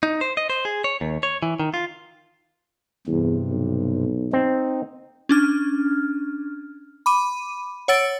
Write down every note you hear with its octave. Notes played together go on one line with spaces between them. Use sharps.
D#4
C5
D#5
C5
G#4
C#5
D#2
C#5
E3
D#3
F4
E2 G2 C3
B1
C4 D#4
C#4 D4 F6
B5 D6 D#7
C#5 F#5 E6 A6 D7